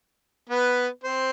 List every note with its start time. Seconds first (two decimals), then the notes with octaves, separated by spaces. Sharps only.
0.50 B3 B4
1.04 C4 C5